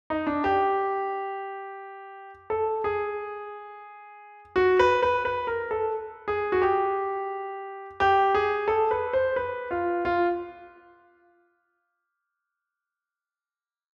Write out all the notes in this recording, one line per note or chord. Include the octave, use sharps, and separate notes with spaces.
D#4
D4
G4
A4
G#4
F#4
B4
B4
B4
A#4
A4
G#4
F#4
G4
G4
G#4
A4
B4
C5
B4
F4
F4